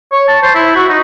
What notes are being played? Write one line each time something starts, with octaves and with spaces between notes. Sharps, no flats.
C#5
A5
C5
E4
F#4
D#4